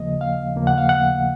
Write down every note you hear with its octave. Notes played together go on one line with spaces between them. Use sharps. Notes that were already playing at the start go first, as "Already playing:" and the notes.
Already playing: D#2 C#3 F3 A#3 D#5
F5
D#2 C#3 F3 A#3
F#5
F5
F#5